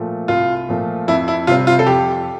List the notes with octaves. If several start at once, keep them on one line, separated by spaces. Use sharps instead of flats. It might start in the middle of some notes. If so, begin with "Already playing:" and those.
Already playing: A#2 F3 A3
C2 F4
A#2 F3 A3
F2 E4
E4
C3 G3 C4 F4
F4
A4
F2 G4